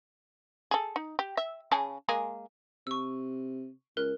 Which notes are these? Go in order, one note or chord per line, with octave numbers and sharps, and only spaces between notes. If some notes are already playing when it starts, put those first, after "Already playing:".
G#4 A4
D#4
G4
E5
C#3 G#4 A5
G#3 A#3 G#4
C3 C#6 E6
C#2 A#4 F#6